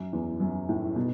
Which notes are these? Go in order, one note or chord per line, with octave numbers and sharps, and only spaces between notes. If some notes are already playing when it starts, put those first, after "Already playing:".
Already playing: F#2
E2
F#2
A2
B2